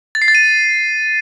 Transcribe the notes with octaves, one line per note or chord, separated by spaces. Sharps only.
A6
C7
A6
D#7